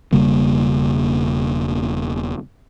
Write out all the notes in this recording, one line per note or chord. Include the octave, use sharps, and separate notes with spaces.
E1 C#3 G3 A#3